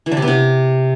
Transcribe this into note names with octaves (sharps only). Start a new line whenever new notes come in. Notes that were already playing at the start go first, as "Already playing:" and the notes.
E3
D3
C3
B3
C3